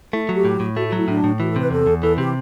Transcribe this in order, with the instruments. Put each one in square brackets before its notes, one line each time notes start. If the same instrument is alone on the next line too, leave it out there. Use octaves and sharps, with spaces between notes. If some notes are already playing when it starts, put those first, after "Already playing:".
[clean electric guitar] A3 [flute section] E4
[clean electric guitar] F#3
[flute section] G4
[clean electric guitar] A2
A2
[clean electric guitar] A3 [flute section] F#4
[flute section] F#4
[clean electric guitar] F#3
[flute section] E4
[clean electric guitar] A2 [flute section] D4
[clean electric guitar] A2
[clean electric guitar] E3 [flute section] F#4
[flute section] A4
[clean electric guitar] C3 [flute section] B4
[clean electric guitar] E2 [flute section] A4
[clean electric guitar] E2
[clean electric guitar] E3 [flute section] A4
[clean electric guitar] C3 [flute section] G4